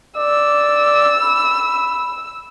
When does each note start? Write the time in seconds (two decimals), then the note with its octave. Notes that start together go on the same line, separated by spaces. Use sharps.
0.18 D5 E6
1.23 B5